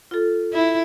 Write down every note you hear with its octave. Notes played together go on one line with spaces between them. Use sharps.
F4 A4
E4